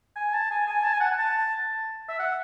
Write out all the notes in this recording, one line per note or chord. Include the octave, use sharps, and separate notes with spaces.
G#5
A5
G#5
G#5
A5
G#5
F#5
A5
E5
F#5